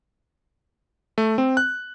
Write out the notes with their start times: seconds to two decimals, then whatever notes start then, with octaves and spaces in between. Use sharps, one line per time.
1.18 A3
1.38 C4
1.57 F#6